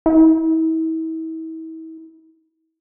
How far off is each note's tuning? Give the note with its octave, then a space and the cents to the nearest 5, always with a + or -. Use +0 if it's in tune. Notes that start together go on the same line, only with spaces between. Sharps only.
E4 -40